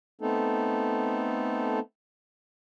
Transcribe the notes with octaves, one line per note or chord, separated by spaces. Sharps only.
A3 B3 C4 D#4 A4